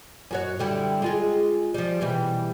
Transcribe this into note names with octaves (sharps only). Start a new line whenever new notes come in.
F#2 F#4 C#5
D3 G3 E4
G#3 F4 G#4
F3 G3
B2 E3 G3